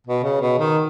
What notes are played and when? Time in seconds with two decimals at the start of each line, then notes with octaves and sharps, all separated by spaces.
0.07 B2
0.23 C#3
0.41 B2
0.59 D#3